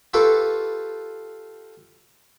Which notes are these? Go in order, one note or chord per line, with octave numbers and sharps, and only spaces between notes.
F4 G4 A4 B4 C#6